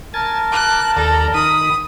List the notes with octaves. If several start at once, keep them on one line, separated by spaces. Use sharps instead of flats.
A#4 G#5 A5 A6
D6 F#6 G6
D#2 A4 D5 A#5
D#3 B5 D#6